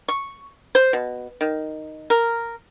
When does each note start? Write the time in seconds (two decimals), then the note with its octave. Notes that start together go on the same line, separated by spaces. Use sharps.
0.08 C#6
0.75 C5
0.93 B2
1.41 D#3
2.10 A#4